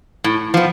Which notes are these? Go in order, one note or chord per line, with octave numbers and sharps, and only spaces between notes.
A2
F3 B3